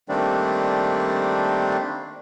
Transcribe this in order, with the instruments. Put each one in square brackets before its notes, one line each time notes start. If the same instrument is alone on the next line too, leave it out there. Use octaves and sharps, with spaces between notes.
[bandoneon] D#3 G3 A3 A#3 C4 D4